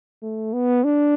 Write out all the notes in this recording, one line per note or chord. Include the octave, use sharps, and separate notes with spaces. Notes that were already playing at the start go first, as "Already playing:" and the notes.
A3
B3
D4